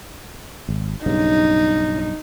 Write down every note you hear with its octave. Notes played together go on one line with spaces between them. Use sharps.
G#1
B1 G2 C#3 D#4